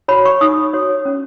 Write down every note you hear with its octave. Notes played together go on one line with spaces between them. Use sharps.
F#4 C#5 B5
C#6
D#4 D#6
F#4 C#5
C#4